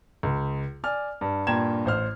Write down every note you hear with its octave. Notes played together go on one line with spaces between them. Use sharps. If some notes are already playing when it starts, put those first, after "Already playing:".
C#2
D5 G#5 F6
G2
G2 A#2 G5 A#5 G#6 E7
A1 C5 F6